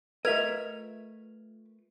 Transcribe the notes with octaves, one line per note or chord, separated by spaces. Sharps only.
A3 F4 A#4 B4 D#5 E5 G#6 F7